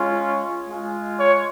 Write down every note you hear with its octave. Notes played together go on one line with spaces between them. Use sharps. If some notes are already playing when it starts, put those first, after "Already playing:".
Already playing: G#3 C#4 F4
G#3 F4
C#5